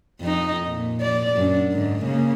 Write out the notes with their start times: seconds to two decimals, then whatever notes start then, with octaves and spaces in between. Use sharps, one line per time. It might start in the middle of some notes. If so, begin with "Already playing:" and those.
0.20 F2 F3 D#4
0.66 A#2
1.01 F3 D5
1.36 F#2 D4
1.72 G#2 D3
2.03 C#3 A#3